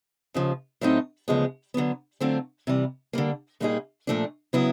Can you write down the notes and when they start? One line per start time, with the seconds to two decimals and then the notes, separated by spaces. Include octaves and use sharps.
0.34 D#2 C#3 F3
0.81 A2 F#3 A3 C4 D#4
1.28 D2 C#3 F3 G#3 B3
1.74 D3 F#3 B3
2.20 D3 F#3 A3 C4 F4
2.67 C3 E3 G3
3.13 D3 G3 A#3
3.60 A#2 G3 A#3 D#4 G#4
4.07 A#2 F3 A3 D4
4.53 C#3 F#3 B3 E4